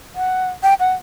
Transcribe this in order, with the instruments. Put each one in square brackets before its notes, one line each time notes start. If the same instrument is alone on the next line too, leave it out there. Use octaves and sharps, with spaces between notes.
[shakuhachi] F#5
G5
F#5